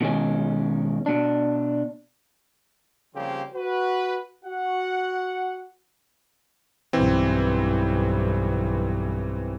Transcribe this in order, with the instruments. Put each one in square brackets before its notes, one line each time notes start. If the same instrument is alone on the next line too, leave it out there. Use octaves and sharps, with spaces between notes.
[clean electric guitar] B2 D#3 G#3 C#4
B2 D4
[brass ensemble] C#3 F3 G3 A#3 C4 G4
F#4 B4
F#4 F#5
[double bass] B1 G2 [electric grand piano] E3 C4